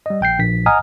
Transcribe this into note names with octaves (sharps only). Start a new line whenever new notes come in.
G3 D#5
A#1 G5 G6 C7
A#1 B6
D#5 F#5 G#5 A#5 D#6 F6